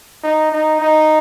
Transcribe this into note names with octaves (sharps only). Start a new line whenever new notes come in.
D#4
D#4
D#4